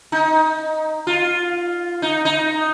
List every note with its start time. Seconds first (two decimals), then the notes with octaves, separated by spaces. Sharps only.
0.12 D#4
1.07 F4
2.02 D#4
2.25 D#4